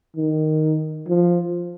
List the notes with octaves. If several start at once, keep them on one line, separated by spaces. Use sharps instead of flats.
D#3
F3